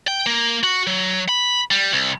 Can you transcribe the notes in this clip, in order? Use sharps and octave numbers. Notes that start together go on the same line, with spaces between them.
G5
A#3
F#4
F#3
B5
G3
C2